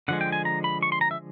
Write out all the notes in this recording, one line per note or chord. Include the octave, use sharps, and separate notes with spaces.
D3 F3 G#3 F#5
G5
G#5
A#5
B5
C#6
C6
A#5
E5